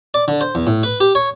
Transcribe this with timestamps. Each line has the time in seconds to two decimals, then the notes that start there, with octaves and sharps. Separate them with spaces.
0.14 D5
0.28 D3
0.41 C5
0.55 E2
0.67 A2
0.83 B4
1.00 G4
1.15 C#5